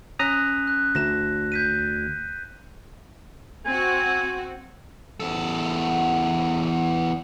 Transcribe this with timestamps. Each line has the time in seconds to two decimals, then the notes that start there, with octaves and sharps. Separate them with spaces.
0.19 C#4 A#5 D#6 F#6 B6
0.67 F#6
0.95 D2 A#6 E7
1.52 G6 B6 D#7
3.66 C4 F#4 G#5
5.20 E2 A4